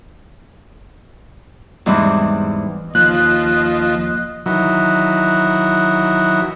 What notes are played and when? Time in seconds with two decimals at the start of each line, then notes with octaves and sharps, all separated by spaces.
1.86 E2 G#2 E3 G3 C4 D6
2.95 D#2 F3 D#5 F#6
4.46 D#3 E3 F#3